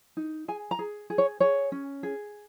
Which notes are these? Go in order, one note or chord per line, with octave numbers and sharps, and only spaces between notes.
D#4
G#4 G#5
A#5
G#4
G#4
C#5
G#4 C#5
C#4
G#4